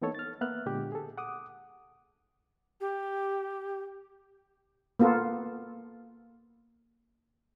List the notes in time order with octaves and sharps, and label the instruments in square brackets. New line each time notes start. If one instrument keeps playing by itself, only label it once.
[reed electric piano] E3 A#3 B3 D#4 A4 C#5
F6 A6
A#3 B3 E5 F6 F#6
A#2 D3 G#3 G4
G#4 A4
F#5 D6 D#6
[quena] G4
[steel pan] A#3 B3 F4 A4